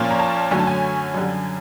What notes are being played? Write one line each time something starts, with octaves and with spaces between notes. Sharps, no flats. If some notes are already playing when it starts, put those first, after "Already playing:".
Already playing: A#2 F3 A#3 C#4
A#5
A5
F#2 D3 F#3 A3 C#4 G#5
A5
G#5
F#2 D3 G3